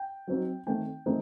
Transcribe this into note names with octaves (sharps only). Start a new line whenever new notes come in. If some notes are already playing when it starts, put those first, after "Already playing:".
Already playing: G5
F#3 C4 D#4
D#3 A3 C4 D#4 G5
D#3 A3 C4 D#4